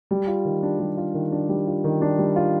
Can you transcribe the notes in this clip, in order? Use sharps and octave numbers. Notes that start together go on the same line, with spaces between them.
G3
F4
D#3
D4
G3
F4
D#3
D4
G3
F4
D#3
D4
G3
F4